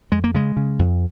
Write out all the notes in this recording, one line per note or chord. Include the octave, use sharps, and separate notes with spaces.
F2 G#3
A#3
C#3 G#3
C#3
F2